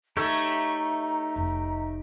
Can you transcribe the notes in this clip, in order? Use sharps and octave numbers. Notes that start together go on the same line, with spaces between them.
A3 D#4 G4 A4 C#5 A#5
F1